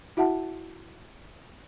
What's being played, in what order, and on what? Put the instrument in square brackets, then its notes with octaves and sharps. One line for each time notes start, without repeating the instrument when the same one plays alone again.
[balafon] E4 F#4 E5 F#5 A5